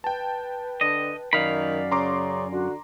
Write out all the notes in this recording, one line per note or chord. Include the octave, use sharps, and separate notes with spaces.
B4 G5 A5
D3 D#5
F#2 D#3 D5 F5 B5
C#3 A#5 C6 D6
D3 F#4